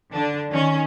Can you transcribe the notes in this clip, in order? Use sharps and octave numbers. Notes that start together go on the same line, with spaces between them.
D3 D4
D#3 C#4